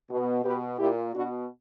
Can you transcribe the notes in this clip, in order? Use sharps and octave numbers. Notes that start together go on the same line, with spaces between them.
B2
B2 G4 B4
A#2 E4 G4
B2 D4 F#4